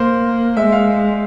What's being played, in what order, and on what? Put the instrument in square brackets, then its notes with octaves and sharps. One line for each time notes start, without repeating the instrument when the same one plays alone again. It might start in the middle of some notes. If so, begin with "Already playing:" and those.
Already playing: [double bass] A#3 [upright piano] C5
[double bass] G#3 [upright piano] E5
[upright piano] F5